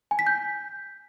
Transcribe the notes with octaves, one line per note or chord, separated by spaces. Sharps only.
G#5
B6
G6